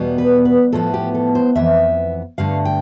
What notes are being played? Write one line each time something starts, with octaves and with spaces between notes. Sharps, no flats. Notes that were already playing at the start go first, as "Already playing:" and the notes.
Already playing: E2 B2 G3 B3
B4
B4
A2 F3 B3 A4
G4
A4
C5
F2 E3 B3 E5
G2 D3 A3 F5
G5